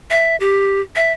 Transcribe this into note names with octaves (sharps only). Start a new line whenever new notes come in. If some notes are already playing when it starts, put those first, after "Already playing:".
E5
G4
E5